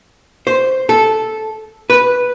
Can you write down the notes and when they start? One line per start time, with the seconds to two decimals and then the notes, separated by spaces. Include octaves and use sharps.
0.47 C5
0.89 A4
1.90 B4